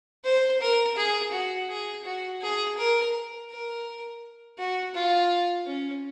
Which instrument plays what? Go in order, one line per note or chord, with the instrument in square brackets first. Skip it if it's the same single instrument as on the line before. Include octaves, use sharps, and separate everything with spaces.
[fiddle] C5
A#4
G#4
F#4
G#4
F#4
G#4
A#4
A#4
F#4
F4
C#4